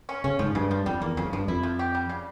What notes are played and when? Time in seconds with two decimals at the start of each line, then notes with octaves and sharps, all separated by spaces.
0.09 C#4
0.24 C#3 C#4
0.39 G#2 F3
0.55 G2 C#3
0.71 F3
0.86 F2 G3
1.02 E2 A#3
1.17 F2 C#3
1.25 G#2
1.33 G2 F3
1.48 F2 E4
1.63 F3
1.79 G4
1.95 G3
2.09 C#3